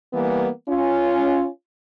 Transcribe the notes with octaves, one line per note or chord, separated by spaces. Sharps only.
E3 G3 A#3 B3
C#4 F4